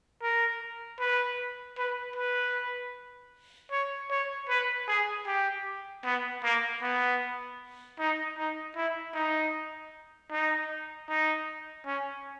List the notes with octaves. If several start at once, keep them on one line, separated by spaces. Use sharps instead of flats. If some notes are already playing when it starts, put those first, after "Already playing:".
A#4
B4
B4
B4
C#5
C#5
B4
G#4
G4
B3
A#3
B3
D#4
D#4
E4
D#4
D#4
D#4
C#4